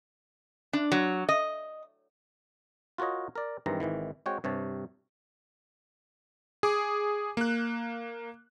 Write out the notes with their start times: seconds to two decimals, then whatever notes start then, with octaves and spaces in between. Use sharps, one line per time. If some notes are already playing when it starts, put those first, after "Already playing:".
0.73 D4
0.92 F#3
1.29 D#5
2.98 F4 F#4 A#4 C#5 D#5
3.35 A#4 D5
3.66 G2 D#3 E3 G#3 C4 A#5
3.80 G#1 G#2 D#3 E3
4.26 G#3 C4 F#4 C#5 G5
4.44 G2 C3 C#5 A5
6.63 G#4 D6
7.37 A#3 F#6